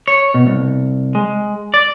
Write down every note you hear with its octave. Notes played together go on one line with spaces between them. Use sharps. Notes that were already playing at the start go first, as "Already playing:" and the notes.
C#5
B2
C2
G#3
D5